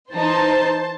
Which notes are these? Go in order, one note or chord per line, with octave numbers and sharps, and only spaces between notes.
E3 D#4 C5 A5